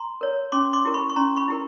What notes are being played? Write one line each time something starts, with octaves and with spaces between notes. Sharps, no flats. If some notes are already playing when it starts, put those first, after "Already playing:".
Already playing: A#5 C6
A#4 C#5
C#4 C6 D6
C6 D6
E4 G4 A#4
B5 C#6
C#6
C#4 A#5 C6
B5 C#6
E4 G4 A#4